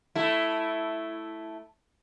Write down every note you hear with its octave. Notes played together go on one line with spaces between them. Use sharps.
A3 E4